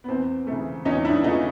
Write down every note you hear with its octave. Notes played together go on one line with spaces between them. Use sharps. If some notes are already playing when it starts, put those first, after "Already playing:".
B3
E2 C4
C#3 E3 A3
E2 C#4 D#4
D4 E4
C#3 E3 A3 D#4 F4